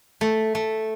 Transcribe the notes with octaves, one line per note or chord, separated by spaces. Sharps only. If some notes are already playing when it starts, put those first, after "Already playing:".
A3
A3